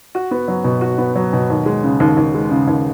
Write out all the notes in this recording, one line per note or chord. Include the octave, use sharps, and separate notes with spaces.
F#4
B3
F#3
B2
F#4
B3
F#3
B2
D#2
G#3
C#3
D#2
D#2
G#3
C#3
D#2